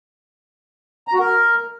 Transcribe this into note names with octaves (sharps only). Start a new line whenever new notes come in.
A#5
F#4
A#4